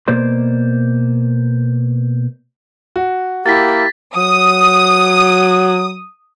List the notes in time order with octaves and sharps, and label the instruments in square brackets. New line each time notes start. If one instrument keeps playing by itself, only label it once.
[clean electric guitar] B2 A#3 C5 D5 C6
[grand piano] F#4
[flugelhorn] A#3 [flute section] E4 G4 [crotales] A6 B6
[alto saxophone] F#3 [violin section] D#6